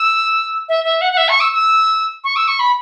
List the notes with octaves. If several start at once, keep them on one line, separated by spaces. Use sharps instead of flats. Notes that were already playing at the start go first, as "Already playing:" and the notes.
Already playing: E6
E5
E5
F#5
F#5
E5
C#6
E6
E6
C#6
E6
C#6
B5